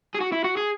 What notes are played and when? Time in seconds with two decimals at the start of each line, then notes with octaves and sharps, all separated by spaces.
0.14 G#4
0.20 F#4
0.32 E4
0.44 F#4
0.57 G#4